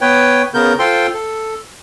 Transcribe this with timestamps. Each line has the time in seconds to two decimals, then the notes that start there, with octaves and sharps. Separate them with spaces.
0.01 B3 B4 C#5 G5
0.54 C#3 B3 A#4 G6
0.79 F4 A4 C5 G5 C6
1.14 A4